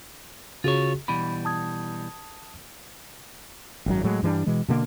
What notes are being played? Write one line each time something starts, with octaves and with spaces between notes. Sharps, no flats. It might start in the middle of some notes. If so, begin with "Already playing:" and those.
C#3 F4 F#4 G#4 C#5
B2 E3 G3 B5
A5 D#6 G#6
G#1 F#2 F#3
A2 F#3 G#3
G2 E3 G3 D4
B2 E3 G#3
B2 D3 A#3